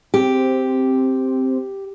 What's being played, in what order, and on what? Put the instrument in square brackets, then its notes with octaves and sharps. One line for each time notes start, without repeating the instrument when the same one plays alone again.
[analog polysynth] C4 [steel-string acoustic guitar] G4